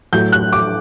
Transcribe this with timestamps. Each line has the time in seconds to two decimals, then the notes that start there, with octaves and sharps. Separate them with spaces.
0.13 A2 F#3 A3 G6
0.32 F#6
0.52 D6